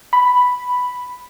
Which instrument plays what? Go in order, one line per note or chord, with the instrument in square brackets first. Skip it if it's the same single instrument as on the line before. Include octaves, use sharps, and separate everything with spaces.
[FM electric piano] B5